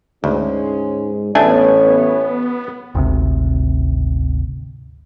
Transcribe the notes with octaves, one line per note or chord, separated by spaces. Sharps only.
D2 G#2 G#3 C#4
A1 E3 A3 B3 D4 B4 C#5 G#5
G#1 D2 C3